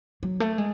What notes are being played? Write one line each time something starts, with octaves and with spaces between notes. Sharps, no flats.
F#3
A3
G#3